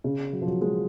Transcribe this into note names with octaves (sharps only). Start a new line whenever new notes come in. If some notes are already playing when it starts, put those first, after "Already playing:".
C#3
F#3
F3
F#3
G#3